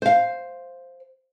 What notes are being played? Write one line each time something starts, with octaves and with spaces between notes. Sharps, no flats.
C5 F5